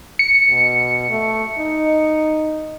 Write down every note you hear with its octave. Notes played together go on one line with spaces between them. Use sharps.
C#7
B2
A3
D#4